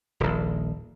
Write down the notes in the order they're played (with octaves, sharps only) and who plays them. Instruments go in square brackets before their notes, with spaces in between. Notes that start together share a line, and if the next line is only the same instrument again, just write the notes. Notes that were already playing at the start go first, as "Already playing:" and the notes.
[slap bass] D#1 A#1